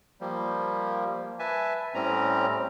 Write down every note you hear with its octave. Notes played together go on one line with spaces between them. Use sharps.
F3 G3 A#3
B4 E5 G#5 A5
A2 G3 C4 C#4 A#5